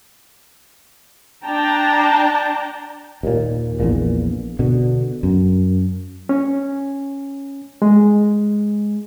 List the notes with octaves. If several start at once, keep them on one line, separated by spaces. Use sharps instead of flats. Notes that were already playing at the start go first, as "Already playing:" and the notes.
D4 G5 A5 A#5
D#2 A#2
A#1 E2 A#2
B2 D3
F#2
C#4
G#3